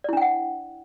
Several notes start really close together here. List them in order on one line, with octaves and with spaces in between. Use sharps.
D5 E4 D4 G5 F#5